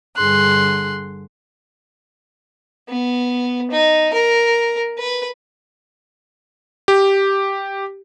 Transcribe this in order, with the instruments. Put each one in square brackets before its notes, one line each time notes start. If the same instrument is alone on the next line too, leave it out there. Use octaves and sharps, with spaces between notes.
[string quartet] G2 D3 G#4 C6 F#6
[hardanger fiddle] B3
D#4
A#4
B4
[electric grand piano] G4